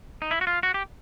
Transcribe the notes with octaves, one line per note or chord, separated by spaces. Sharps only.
D#4
E4
F#4
F4
F#4
G4